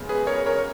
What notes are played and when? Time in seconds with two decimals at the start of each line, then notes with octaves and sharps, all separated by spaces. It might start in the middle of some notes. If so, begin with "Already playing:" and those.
Already playing: F#2 C#3 G#3 B3
0.09 G#4 B4
0.27 A#4 C#5
0.46 A#4 C#5